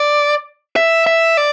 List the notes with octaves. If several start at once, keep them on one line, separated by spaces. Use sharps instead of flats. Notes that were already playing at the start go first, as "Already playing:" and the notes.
Already playing: D5
E5
E5
D5